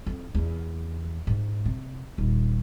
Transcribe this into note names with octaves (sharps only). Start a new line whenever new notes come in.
F2
E2
G#2
C3
D#1